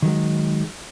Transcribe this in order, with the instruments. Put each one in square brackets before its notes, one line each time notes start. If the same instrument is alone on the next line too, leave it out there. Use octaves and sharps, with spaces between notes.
[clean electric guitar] D#3 F#3 G#3